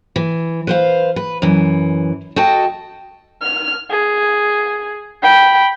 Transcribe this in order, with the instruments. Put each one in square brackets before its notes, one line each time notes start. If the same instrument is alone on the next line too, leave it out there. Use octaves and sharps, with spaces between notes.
[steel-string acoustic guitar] E3
B4 C5 F5
B4
F#2 E3
F#4 A4 D#5 G5 A5
[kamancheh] F6
G#4
G5 B5